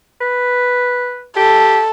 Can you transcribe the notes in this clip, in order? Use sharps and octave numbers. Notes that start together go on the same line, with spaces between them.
B4
G4 A4